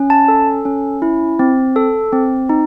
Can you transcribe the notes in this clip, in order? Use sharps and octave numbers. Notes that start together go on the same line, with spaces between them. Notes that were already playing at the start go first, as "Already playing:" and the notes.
Already playing: C#4
A5
A4
C#4
E4
C4
A4
C4
D#4